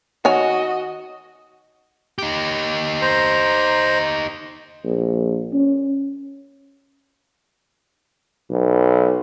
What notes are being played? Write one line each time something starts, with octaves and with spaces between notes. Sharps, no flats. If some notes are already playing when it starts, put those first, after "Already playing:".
D#3 F#4 C#5 D#5 G#5
D#4 G4
C5 A#5
A#1
C#4
B1